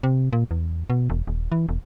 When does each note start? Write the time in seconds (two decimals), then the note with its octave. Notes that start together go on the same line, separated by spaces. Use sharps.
0.03 C3
0.33 A#2
0.51 E2
0.90 B2
1.10 E1
1.27 D#1
1.52 E3
1.69 E1